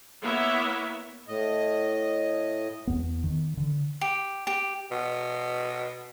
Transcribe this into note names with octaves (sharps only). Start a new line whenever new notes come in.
A#3 B3 E4 C#5 E5
A2 D#5
E2 B3
D#3
D3
G4
G4
B2